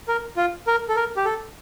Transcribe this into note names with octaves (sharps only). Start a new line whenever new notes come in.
A#4
F4
A#4
A4
A#4
G4
A4